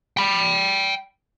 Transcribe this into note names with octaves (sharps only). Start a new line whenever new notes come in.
G5 B5